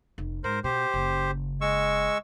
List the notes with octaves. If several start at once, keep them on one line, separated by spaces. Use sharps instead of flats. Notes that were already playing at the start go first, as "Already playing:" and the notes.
F1
G#2 A#4 C5
B2 G4 C5
F#1 C#3
G#3 C#6 E6